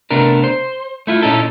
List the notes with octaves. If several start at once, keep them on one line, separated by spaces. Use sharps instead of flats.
C3 A3 B3 D4 A#4
C5
A3 E4 F4
A#2 C#4 D#4 E4 A4